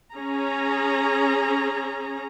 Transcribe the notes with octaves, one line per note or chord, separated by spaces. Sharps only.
C#4 G#4 A#5